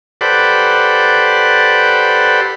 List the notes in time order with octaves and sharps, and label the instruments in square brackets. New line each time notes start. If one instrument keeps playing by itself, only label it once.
[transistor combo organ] G4 A4 B4 C5 D5 F#5